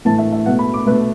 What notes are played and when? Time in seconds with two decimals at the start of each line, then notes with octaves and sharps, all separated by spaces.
0.05 A2 E3 A3 A5
0.18 E5
0.32 E5
0.46 B2 A3 F#5
0.59 B5
0.74 D6
0.86 B2 A3 B4